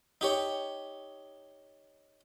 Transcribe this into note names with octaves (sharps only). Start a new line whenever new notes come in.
D#4 G4 C#5